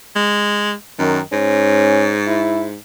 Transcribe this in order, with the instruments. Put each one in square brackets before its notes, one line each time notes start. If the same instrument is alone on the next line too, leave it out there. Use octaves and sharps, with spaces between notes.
[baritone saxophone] G#3
[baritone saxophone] F#2 [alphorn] D#3
[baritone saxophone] G#2 [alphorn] C#4
[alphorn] E4